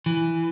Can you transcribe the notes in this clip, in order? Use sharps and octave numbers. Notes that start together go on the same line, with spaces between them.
E3